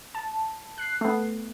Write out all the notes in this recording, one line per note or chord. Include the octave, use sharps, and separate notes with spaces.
A5
F#6 C7
A3 B3